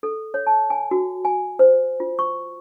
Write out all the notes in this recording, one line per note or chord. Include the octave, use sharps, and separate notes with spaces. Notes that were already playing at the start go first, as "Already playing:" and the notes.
A4
C#5
A5
G#5
F#4
G#5
C5
F4
C#6